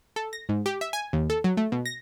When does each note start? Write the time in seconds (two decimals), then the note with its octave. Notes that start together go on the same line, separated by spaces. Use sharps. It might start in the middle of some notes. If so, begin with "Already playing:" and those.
0.16 A4
0.33 A#6
0.49 G#2
0.66 G4
0.81 E5
0.93 G#5
1.13 D#2
1.30 A4
1.44 F#3
1.57 A3
1.72 B2
1.86 A#6